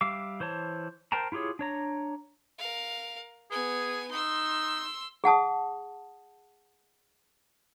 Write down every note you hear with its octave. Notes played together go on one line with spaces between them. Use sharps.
G3 E5 F5 D6
E3 C5 C#5 A5
A#4 C5 G5 A5 A#5
E4 F4 G4 G#4 C#5
D4 C#5 A#5
A#4 F5
B3 G#4 G#5
D#4 C6 E6
G#4 F#5 A5 D#6